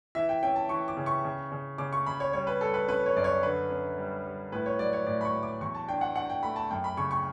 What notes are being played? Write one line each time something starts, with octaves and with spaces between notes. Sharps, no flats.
E3 E5
G5
C#4 G5
A5
E3 C#6
D6
C#3
C#6
C#3
C#3
C#3 D6
C#6
C#3 B5
C#5
G3 C#5
B4
G3 A4
B4
C#4 B4
C#5
F#2 D5
C#5
D3 B4
C#4
G3
G3
A2 B4
C#5
F#3 D5
C#5
A2 D5
B5
C#6
F#3
D6
E2 C#6
A5
D4 G5
F#5
D4 F#5
G5
A3 B5
A5
F#2 G5
B5
C#3 C#6
C#6